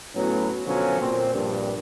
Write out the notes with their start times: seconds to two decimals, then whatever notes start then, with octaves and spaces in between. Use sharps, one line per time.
0.15 A2 F#3 B3 C#4
0.66 B2 D3 F3 F#3 C#4
1.01 A#2 C4
1.33 A#1 G2